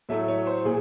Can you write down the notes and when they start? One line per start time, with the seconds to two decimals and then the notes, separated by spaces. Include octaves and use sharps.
0.09 A2 F#3 A3 E5
0.28 C#5
0.47 C5
0.65 A#2 G#4